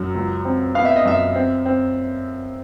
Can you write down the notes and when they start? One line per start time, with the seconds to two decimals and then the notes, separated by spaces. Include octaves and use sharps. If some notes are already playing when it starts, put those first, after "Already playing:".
Already playing: F#2 F#3
0.15 C#2
0.45 C4
0.74 B3 F5
0.85 E5
0.96 D#5
1.06 F#2 E5
1.35 C4
1.66 C4